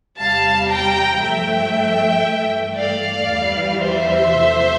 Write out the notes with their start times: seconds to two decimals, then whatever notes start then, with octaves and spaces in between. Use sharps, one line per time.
0.19 E2 C3 G3 F5 A5
0.71 G5 A#5
1.23 G2 F3 A3 E5 G5
2.26 G2 E3 A3
2.77 D5 F5
3.29 E2 E3 G3
3.81 C5 E5
4.32 E2 C3 F3 A3